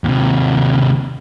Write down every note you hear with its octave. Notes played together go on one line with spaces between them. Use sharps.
D#2 C3